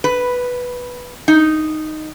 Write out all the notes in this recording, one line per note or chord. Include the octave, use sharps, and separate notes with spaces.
B4
D#4